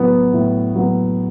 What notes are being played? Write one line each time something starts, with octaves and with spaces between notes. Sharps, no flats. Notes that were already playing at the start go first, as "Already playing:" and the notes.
Already playing: A2 F#3 B3
A2
F#3 B3